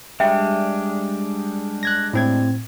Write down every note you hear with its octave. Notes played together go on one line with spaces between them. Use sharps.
G3 G#3 D4 E5 G5
F#6 G#6 A#6
A2 C4 G#6